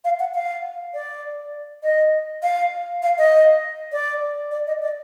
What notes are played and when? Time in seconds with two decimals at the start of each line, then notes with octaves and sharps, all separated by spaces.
0.04 F5
0.19 F#5
0.34 F5
0.94 D5
1.83 D#5
2.43 F5
3.02 F5
3.18 D#5
3.92 D5
4.51 D5
4.67 D#5
4.82 D5